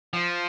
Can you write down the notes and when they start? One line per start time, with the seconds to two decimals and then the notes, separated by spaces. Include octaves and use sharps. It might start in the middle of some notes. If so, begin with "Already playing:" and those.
0.13 F3